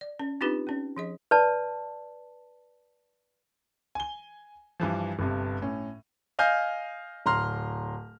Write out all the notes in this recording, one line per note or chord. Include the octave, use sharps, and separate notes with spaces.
D5
C#4
C4 D4 D#4 F4 G4 B4
B3 C#4
F3 G#4 D#5
B4 D5 A5
G#5 G7
G2 E3 F3
G1 G2 C3
A2 C#4
D#5 F5 G#5 F6 G6
D1 A#5 C6 F6